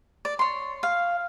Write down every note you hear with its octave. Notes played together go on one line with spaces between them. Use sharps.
D5
C#5 C6
F5